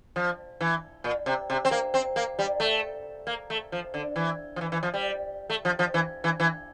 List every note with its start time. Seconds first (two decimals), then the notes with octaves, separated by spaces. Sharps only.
0.16 F3
0.61 E3
1.04 A#2
1.26 C3
1.50 C3
1.65 C4
1.71 A#3
1.94 C4
2.16 A#3
2.39 G3
2.60 A3
3.27 A#3
3.50 A3
3.72 F3
3.94 D3
4.16 E3
4.56 F3
4.61 E3
4.72 E3
4.83 F3
4.94 G3
5.50 A3
5.65 F3
5.79 F3
5.94 E3
6.24 E3
6.40 E3